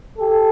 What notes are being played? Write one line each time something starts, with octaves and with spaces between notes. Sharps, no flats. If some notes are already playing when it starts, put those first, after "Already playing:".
G4 A4